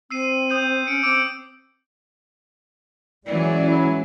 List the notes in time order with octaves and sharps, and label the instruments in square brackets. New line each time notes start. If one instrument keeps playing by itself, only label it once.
[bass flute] C4 [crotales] E6 C7 D#7
[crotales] D#6 G6 D#7
[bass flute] C#4 [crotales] C#7 D7
[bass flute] C4 [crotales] D6 E6 D7
[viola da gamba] E3 F#3 [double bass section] G#3 C#4 [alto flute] D5
[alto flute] E4